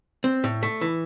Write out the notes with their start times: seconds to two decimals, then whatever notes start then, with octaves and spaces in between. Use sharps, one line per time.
0.24 C4
0.44 A2
0.63 A3
0.81 E3